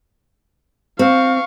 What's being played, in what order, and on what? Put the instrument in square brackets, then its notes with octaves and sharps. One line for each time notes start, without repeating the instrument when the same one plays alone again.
[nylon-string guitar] C4 [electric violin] F5 C#6